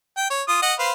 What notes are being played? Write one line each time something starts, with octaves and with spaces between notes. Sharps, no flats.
G5
C#5
F4 D#6
D#5 F#5
B4 C5 F5